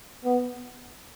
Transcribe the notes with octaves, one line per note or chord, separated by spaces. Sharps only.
B3